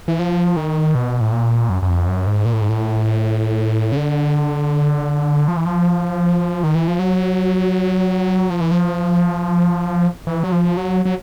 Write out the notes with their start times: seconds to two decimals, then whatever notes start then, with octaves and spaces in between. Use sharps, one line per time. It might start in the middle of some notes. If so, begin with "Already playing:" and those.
0.08 E3
0.19 F3
0.56 D#3
0.95 B2
1.21 A2
1.32 A#2
1.70 F#2
1.82 F#2
1.89 F2
2.07 F#2
2.27 G#2
2.45 A#2
2.53 A2
2.61 G#2
2.69 A2
3.92 C#3
3.97 D3
5.48 F3
5.57 E3
5.66 F3
6.63 D#3
6.75 E3
6.88 F3
6.99 F#3
8.50 F3
8.61 E3
8.71 F3
10.27 E3
10.43 F#3
10.52 F3
10.77 F#3
11.05 F#3